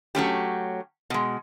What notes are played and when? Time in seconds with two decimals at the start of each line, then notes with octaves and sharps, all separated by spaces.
0.15 F#3 A3 C#4 G4
1.10 B2 G#3